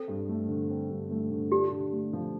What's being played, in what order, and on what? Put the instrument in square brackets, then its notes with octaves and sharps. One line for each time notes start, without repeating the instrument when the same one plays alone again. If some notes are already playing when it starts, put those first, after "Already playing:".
Already playing: [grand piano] C4 [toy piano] A4
[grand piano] G2
A3
D3
C4
G2
A3
D3
[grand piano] D4 [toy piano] G4
[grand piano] D3
A3
F3